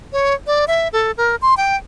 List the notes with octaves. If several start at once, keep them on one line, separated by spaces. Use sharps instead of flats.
C#5
D5
E5
A4
A#4
C6
G5